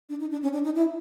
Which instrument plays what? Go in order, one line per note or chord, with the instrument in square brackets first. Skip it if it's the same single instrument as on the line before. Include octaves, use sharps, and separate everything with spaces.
[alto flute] D4
D#4
D4
C#4
D4
D#4
E4